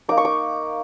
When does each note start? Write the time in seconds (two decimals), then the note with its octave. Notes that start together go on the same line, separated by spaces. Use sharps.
0.09 A#3 D#4 D6
0.17 C#6
0.25 D6